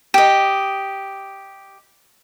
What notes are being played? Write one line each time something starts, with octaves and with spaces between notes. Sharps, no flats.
G4 D#5